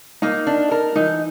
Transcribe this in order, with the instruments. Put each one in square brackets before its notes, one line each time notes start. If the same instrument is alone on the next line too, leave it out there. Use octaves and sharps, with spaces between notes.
[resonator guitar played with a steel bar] A#3 [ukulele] D#4
[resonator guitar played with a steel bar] D4
A#4
[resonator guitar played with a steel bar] E3 [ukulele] D#4